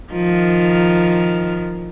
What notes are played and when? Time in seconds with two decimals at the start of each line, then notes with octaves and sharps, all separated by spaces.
0.12 D#3 F3